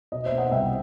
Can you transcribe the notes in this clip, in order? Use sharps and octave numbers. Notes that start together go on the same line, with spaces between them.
B2 D#5
C5 E5
B3
D#5 F#5
C2 E5 G5